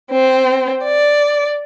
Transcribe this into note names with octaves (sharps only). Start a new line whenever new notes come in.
C4
D5